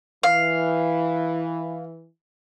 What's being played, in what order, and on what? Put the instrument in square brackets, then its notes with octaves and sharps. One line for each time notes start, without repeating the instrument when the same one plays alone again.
[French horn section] E3 [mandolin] F5